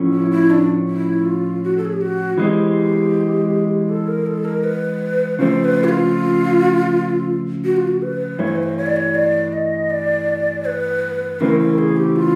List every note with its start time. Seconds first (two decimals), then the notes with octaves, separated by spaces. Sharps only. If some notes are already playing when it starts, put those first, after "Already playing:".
Already playing: A2 F3 A3 C#4
0.13 E4
0.31 E4
0.50 D4
0.88 E4
1.26 F4
1.64 F#4
1.77 A4
1.85 G#4
1.93 G4
2.01 F#4
2.38 E3 G#3 C4 G4
3.89 A4
4.07 A#4
4.26 A4
4.45 A#4
4.64 B4
5.39 C#3 F3 A3 C4 C5
5.64 B4
5.84 E4
5.89 F4
7.64 F#4
7.77 F4
7.88 F#4
8.02 B4
8.39 G2 E3 A3 C#5
8.47 C5
8.56 B4
8.63 C5
8.77 C#5
8.86 D5
8.96 C#5
9.15 D5
9.53 D#5
9.90 D5
10.65 B4
11.40 C#3 E3 A3 C4 A#4
11.59 A#4
11.78 G#4
11.96 G4
12.16 F4